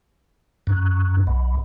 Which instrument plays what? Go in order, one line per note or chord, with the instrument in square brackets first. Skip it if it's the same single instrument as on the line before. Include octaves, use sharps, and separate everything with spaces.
[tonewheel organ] F#2
B1